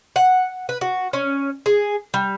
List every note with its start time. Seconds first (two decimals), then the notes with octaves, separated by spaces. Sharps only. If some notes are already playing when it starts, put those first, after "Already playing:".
0.16 F#5
0.69 B4
0.81 F#4
1.13 C#4
1.66 G#4
2.14 G3